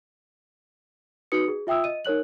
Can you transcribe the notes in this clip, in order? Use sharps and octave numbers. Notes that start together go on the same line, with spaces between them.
D#4 F#4 B4 D#6 C#7
G#4
F4 E5 G5 D#6 E6
D#5 D#7
D#4 A#4 C#5 F#6 F#7